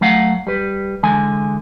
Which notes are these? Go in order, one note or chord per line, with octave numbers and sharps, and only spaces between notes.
F#3 A3 F5 F#5
G3 B4
D3 E3 G#3 G#5